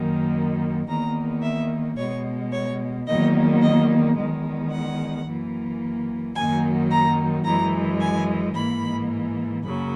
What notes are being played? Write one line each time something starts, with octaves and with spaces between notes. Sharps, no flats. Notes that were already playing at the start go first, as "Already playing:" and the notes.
Already playing: F#2 D#3 A#3
E2 D#3 A#3 A#5
E5
B2 G#3 C#5
C#5
E2 D#3 F#3 A#3 D#5
D#5
E2 D#3 G#3
F#5
F#2 E3 A#3
F#2 D#3 F#3 A#3 G#5
A#5
F#2 E3 G#3 A#5
G#5
G#2 E3 A#3 B5
F#2 C#3 F#3 A#3 B5